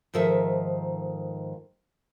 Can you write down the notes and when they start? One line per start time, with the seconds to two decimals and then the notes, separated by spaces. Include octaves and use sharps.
0.14 G#2 D#3 F3 A4 E5